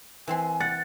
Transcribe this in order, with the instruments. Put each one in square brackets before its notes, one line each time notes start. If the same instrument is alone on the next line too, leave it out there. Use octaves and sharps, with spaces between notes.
[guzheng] E3 C4 C6 [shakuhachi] G#5
[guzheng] F#5 [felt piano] A6